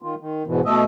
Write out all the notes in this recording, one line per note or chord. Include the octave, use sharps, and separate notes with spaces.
D#3 F4
D#3
E2 G#2 B2 E3
B2 A3 D#5 E5